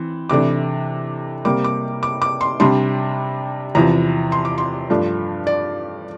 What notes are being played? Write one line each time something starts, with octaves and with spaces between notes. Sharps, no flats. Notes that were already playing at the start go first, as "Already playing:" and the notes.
Already playing: E3 C4
C3 E3 A3 D4 D6
C3 G3 A#3 D6
D6
D6
D6
C6
C3 G3 D4 C6
E2 C3 F3 A#5
C6
D6
C6
G2 F3 A3 D4
D5